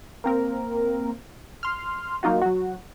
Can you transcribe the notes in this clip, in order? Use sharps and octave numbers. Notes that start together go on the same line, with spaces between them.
A#3 C4 A#4
C6 F6
F#3 A#3 D#4 F4 F#4
F#3 F#4